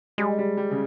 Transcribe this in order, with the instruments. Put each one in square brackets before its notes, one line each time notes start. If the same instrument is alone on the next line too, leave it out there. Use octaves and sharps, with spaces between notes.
[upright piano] G3 [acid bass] G#3
[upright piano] G3
G3
C#3